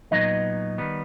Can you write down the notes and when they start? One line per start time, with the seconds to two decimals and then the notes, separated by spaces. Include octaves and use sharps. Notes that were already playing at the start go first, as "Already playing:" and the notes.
0.11 A#2 F#3 B3 D#4 D#5
0.78 D#3 G3 B3